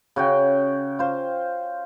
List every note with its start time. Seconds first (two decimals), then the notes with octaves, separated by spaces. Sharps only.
0.16 C#3 F#4 G5
0.99 F4 C5